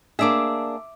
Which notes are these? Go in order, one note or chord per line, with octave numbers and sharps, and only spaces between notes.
A#3 D4 G#4 E5 D6